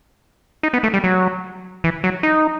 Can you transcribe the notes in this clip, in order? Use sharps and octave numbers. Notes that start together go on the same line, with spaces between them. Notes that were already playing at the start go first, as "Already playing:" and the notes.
D#4
B3
A3
G3
F#3
E3
F#3
D#4